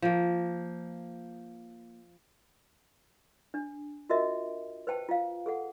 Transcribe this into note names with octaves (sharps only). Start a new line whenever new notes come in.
F3 A#3
D4
F4 F#4 A#4 D#5 E5
B4 C5 G5 A5
F4 F5
G#4 A4 F#5